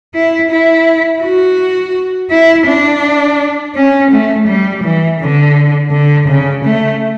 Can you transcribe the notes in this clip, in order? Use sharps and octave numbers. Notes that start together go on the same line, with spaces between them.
E4
E4
F#4
E4
D4
C#4
A3
G3
E3
D3
D3
C#3
A3